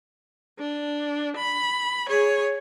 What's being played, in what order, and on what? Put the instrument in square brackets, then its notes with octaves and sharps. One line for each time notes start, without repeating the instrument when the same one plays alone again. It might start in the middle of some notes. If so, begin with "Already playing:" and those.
[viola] D4
B5
G#4 C#5